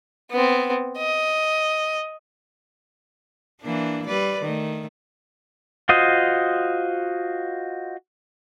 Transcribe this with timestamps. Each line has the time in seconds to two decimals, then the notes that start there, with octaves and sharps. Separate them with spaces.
0.31 B3 C4
0.98 D#5
3.61 E3 A#3 D4
4.07 G3 B4 D5
4.43 D#3 A3
5.89 F4 F#4 C5 D#5